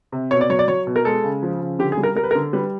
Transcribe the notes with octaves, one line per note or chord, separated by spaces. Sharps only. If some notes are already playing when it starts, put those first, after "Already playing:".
C3
B2 C#5
D5
F#3 C#5
D5
F#3 C#5
B2
A#4
G#3 A4
C#3
F3
C#3
D3 G4
G#4
G3
A#4
G3 A#4
B4
A#4
D3
G3 B4